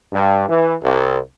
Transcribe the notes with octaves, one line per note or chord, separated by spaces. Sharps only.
G2
E3
C2